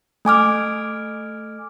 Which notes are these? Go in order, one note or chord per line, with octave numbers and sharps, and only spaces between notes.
A3 G#5 D6 F6